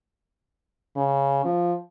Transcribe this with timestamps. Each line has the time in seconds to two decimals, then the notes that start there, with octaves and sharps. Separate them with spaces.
0.96 C#3
1.45 F3